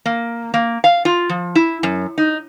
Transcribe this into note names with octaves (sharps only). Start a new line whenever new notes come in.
A#3
A#3
F5
F4
F3
E4
F#2
D#4